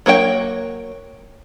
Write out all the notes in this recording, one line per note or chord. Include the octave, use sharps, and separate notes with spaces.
F#3 A#3 C#5 G5